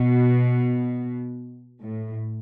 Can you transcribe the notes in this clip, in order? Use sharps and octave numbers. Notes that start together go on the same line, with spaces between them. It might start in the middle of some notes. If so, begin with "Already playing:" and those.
Already playing: B2
A2